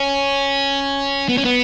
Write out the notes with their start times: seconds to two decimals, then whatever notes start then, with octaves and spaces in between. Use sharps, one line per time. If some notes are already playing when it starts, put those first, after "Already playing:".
Already playing: C#4
1.28 B3
1.37 C#4
1.44 B3